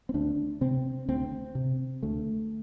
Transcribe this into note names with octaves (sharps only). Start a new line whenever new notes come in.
C4
D2 D4
C3 C4
D2 C4
C3
D2 A3